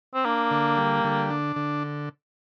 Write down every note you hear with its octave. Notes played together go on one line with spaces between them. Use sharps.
C4
A#3 D4
D3
G3
D3
D4
D3